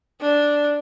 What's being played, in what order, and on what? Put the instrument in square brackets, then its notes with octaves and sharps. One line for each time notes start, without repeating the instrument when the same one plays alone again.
[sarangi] D4